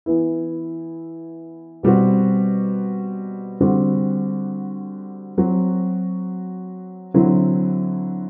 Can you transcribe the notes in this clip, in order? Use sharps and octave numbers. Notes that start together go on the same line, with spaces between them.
E3 B3 E4
B2 G3 C4 F#4
D3 G3 C4 F#4
F#3 C4 F#4
D3 F#3 C4 E4